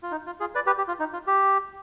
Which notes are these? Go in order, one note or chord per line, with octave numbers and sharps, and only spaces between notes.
F4
D#4
F4
F4 G#4
B4 D5
G4 B4
G4
F4
D#4
F4
G4